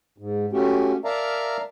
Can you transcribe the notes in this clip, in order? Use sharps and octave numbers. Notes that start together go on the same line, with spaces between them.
G#2
A3 C#4 F#4 G4
A#4 D5 E5 F5 A5 A#5